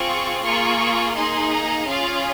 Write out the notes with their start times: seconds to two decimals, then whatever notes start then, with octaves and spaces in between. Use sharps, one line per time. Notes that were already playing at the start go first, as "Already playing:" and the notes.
Already playing: C4 F4 G#4 C#6
0.42 A#3 F4 G#4 C#6
1.15 A#3 D#4 G#4 C6
1.50 A#5
1.87 C#4 F4 G#4 F5